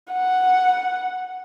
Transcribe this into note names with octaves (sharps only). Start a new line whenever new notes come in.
F#5